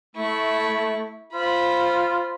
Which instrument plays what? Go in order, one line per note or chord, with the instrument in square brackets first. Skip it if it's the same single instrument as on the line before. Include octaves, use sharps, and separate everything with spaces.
[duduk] A3 [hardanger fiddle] E4 C#6
[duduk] F4 [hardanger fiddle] C5 B5